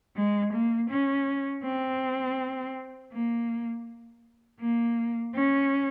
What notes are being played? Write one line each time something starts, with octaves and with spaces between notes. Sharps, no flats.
G#3
A#3
C#4
C4
A#3
A#3
C#4